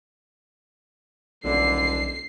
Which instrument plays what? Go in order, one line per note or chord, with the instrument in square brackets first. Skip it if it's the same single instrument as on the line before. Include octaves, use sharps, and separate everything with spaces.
[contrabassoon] D#1 [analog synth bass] B1 [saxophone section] D3 [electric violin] C7